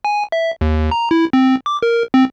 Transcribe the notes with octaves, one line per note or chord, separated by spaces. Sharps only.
G#5
E5
D#2
A#5
E4
C4
D6
A#4
C4